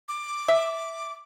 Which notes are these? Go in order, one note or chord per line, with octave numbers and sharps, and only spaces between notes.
D6
E5